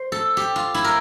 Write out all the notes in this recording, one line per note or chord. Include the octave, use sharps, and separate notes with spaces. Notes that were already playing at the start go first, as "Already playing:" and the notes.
Already playing: C5
A4
G4
F4
E4
A#4